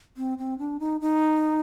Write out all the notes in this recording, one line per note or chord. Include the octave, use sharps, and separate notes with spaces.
C4
C4
D4
D#4
D#4